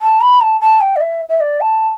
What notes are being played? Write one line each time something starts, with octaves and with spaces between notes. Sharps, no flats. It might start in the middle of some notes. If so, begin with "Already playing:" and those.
A5
B5
A5
A5
G5
D5
E5
E5
D5
A5